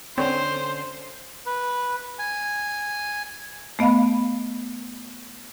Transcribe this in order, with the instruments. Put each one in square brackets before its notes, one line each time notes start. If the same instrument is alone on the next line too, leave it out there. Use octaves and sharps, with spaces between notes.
[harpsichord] D3 C#4 [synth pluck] C4 C#5 [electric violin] C5
[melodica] B4
G#5
[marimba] A3 B3 D#5 F5 B5